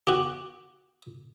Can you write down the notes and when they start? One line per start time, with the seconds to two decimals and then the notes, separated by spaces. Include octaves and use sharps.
0.07 F#4 G4